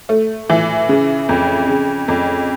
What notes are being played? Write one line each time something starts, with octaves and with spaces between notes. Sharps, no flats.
A3
E3
C#3
F2
C#3
F2